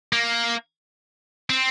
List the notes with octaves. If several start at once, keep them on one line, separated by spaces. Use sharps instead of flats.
A#3
C4